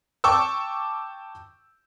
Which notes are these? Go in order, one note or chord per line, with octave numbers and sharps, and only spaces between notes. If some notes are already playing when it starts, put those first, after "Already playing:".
G5 A5 C#6 D6 E6